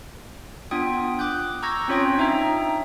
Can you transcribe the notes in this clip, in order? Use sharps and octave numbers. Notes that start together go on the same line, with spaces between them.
B3 D4 F4 G5 D#6
D6 F#6 G6
A#5 C#6 E6 G6 G#6 A#6
C4 C#4 F4 C#5 G5 D#6
D4 D#4 E5 G5 A#5